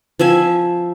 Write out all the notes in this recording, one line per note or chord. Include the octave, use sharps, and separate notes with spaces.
F3 C4 E5 G#5